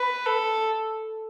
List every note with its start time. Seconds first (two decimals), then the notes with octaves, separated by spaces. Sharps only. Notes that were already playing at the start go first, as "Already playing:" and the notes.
Already playing: B4
0.26 A4